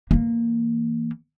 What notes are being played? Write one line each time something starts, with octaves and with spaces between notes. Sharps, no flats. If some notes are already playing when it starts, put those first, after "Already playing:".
E3 A#3